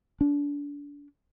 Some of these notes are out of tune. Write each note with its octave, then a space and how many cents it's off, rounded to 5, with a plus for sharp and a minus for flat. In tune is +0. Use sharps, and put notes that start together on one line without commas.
D4 -30